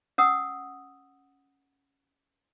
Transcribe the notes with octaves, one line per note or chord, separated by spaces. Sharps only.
C#4 F#5 D#6 E6